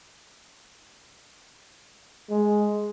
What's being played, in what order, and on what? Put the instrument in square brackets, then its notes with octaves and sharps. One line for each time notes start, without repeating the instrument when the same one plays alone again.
[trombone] G#3